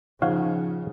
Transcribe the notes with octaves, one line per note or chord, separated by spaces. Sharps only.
C#3 F3 D#4 C#5 F5 F#5